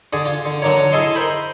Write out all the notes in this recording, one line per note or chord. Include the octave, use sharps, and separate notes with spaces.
D3 G#4 D5
F4
D3
D3 F#3 D4 A#4 C#5
E4 G#4 A4 D#5 C6
A#4 C5 G5 B5